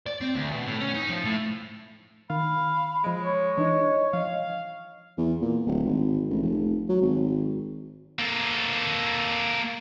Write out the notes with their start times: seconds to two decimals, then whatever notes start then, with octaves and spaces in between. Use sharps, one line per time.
0.06 D5
0.21 C4
0.35 D2
0.51 B2
0.66 A2
0.80 C#4
0.94 D#4
1.09 F3
1.24 A2
2.30 D#3 F5 B5
3.04 F3 G#3 D#5 D7
3.22 C#5
3.57 E3 D4 D#4 D#5
4.14 F3 F5
5.17 E2
5.42 A#2
5.66 D1
5.85 G#1
6.30 A1
6.43 F1
6.89 F#3
7.01 G#1
8.19 A#3 A4